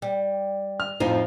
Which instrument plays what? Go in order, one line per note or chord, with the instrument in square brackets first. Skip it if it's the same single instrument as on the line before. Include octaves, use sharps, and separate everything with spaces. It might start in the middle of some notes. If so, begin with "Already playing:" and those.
[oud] G3
[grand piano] F6
[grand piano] F2 A2 [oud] F3 D#4